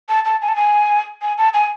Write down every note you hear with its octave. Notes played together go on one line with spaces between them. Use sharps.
A5
A5
G#5
A5
G#5
G#5
A5
G#5